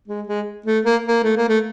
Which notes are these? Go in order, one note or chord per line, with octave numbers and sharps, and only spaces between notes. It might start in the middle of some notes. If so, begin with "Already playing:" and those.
G#3
G#3
A3
A#3
A#3
A3
A#3
A3